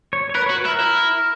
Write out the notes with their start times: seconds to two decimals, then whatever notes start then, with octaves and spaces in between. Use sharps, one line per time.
0.13 C#5
0.29 C#5
0.35 A#4 B4
0.46 C#5
0.50 F#4
0.58 B4
0.65 E4
0.68 A#4
0.80 E4